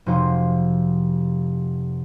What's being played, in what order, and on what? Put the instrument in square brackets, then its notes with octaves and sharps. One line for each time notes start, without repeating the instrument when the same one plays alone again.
[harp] F1 C3 F3 F#4 C5 F5